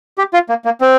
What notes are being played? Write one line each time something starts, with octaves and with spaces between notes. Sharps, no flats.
G4
F4
A#3
A#3
C4